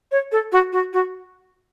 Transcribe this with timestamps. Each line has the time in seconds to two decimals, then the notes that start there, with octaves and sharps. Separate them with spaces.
0.11 C#5
0.32 A4
0.52 F#4
0.72 F#4
0.93 F#4